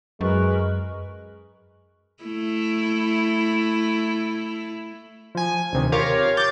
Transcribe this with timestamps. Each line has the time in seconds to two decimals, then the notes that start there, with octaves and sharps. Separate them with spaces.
0.21 F#2 G#3 A#4 B4 C#6
2.24 A3 E4
5.35 F3 G#5
5.73 D2 C3 D#3
5.92 F4 G4 A#4 C#5 F5
6.37 D6 G6 A6